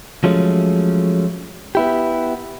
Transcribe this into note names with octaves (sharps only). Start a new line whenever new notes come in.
F3 F#3 G#3 A3 C#4
B3 E4 G4